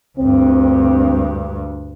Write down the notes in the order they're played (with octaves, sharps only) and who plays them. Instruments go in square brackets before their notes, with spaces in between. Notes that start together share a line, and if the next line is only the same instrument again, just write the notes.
[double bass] D2 G2 [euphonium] C4